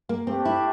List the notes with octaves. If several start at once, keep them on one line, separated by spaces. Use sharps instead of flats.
A#3
A3 C4 D4 G4
E4